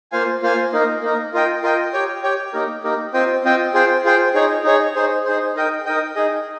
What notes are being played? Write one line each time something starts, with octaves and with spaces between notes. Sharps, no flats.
A#3 F4 C5 F5 G#5
A#3 F4 C5 F5 G#5
A#3 D#4 A#4
A#3 D#4 A#4
F4 A#4 D#5 G5
F4 A#4 D#5 G5
G4 C#5 G5
G4 C#5 G5
A#3 D#4 G4 A#4
A#3 D#4 G4 A#4
C4 F4 C5 D#5 G5
C4 F4 C5 D#5 G5
F4 G#4 C5 G5
F4 G#4 C5 G5
D#4 G#4 C#5
D#4 G#4 C#5
D#4 G#4 C5
D#4 G#4 C5
D#4 A#4 D#5 G5
D#4 A#4 D#5 G5
D#4 G#4 D#5